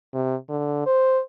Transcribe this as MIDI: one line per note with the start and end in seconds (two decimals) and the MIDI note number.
0.14 0.35 48
0.49 0.83 50
0.86 1.20 72